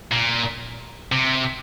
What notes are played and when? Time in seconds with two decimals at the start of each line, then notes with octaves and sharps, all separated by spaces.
0.11 A#2
1.12 C3